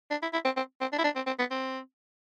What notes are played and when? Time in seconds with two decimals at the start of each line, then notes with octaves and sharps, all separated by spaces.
0.11 D4
0.22 E4
0.33 E4
0.45 C4
0.57 C4
0.81 C4
0.93 D4
0.98 E4
1.04 D4
1.16 C4
1.27 C4
1.39 B3
1.51 C4